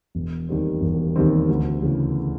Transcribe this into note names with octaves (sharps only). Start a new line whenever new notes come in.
E1
D#2 D#3 G3 C4
E1
D#2 D#3 G3 C4
D2
C#3 E3